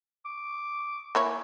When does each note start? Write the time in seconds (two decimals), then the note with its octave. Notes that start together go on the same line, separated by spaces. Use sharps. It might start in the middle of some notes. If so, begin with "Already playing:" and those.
0.25 D6
1.15 A#3 E4 C#5 G#5